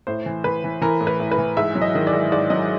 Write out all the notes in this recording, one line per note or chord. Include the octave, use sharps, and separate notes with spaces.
A2 C5
E3
E3 B4
E3
E3 A#4
A2
B4
A2
B4
E3
G#2 E5
F#3
D#5
D#3
D5
G#2
G#2 D5
F#3 D#5